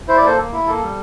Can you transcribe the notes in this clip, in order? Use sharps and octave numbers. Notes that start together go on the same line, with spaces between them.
E4 C5
D5
A#3 A4 C5
A#3
E4
A#3 A4
G3